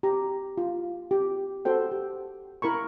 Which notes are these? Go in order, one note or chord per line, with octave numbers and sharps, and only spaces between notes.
G4 A#5
F4
G4
F#4 A4 C5 G5
G4
E4 A#4 B5 C#6